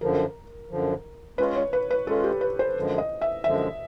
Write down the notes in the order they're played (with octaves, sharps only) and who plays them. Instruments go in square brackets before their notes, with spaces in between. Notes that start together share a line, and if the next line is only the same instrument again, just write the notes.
[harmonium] F#2 D3 F3 [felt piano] A#4
[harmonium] F#2 D3 F3
[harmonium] G#3 C#4 F4 [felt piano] B4
[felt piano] C#5
B4
B4
[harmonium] G#3 C#4 F4 [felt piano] A4
[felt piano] G4
B4
C5
[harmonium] F#2 D3 F3 G#3
[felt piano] D#5
E5
[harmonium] F#2 D3 F3 G#3 [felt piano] E5